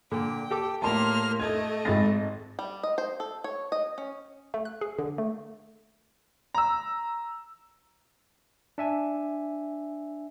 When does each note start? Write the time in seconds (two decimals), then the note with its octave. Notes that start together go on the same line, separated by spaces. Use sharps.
0.12 A#2 D3 G5
0.50 G4 A4 D6
0.82 A2 A#3 A5 C6 F6
1.40 A3 D#5 G#6
1.85 G#1 G#2 B5 A6 A#6
2.59 G3
2.83 D#5
2.98 C5
3.20 A4
3.44 C#5
3.72 D#5
3.98 C#4
4.54 A3
4.65 F#6
4.81 G#4
4.99 D3
5.18 A3
6.54 A#5 E6
8.78 D4 E5 G#5